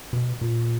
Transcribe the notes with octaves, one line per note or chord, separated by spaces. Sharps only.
B2
A#2